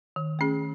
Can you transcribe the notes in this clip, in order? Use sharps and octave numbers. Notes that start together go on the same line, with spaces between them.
D#3
A3 C#4 G#4